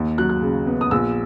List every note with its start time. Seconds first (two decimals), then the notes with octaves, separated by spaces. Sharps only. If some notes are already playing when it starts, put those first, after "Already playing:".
Already playing: D#2
0.18 F#3 F#6
0.29 F#6
0.42 C#3
0.67 B3
0.81 D#6
0.91 A#1 E6